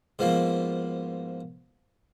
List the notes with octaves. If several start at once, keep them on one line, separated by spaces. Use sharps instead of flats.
G#2 B2 F3 A#3